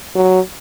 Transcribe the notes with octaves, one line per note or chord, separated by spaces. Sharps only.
F#3